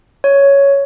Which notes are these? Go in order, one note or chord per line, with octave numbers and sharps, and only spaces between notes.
C#5